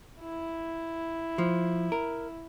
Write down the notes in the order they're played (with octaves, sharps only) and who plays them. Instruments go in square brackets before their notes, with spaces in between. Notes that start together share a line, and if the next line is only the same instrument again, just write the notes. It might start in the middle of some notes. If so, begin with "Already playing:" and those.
[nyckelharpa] E4
[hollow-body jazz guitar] F3
A#4